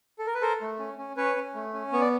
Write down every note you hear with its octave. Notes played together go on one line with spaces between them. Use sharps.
A4
A#4
B4
A4 A#4 C5
A3
C#4
C#4
C#4 B4 C#5
C#4
A3
C#4
B3 C#5
D5